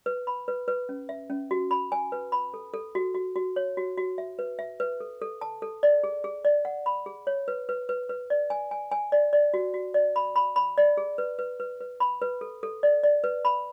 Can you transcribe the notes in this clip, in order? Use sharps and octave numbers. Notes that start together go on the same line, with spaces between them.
B4
B5
B4
B4
C#4
E5
C#4
F#4
B5
G#5
B4
B5
A4
A4
F#4
F#4
F#4
C#5
F#4
F#4
E5
B4
E5
B4
A4
A4
A5
A4
D5
G#4
G#4
D5
F#5
B5
G#4
C#5
B4
B4
B4
B4
D5
G#5
G#5
G#5
D5
D5
F#4
F#4
D5
B5
B5
B5
D5
G#4
B4
B4
B4
B4
B5
B4
A4
A4
D5
D5
B4
B5